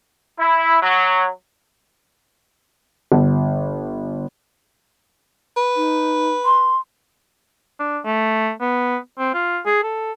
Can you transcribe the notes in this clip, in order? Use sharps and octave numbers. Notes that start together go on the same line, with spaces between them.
E4
F#3
G1
B4
D#4
C6
D4
A3
B3
C4
F4
G#4
A4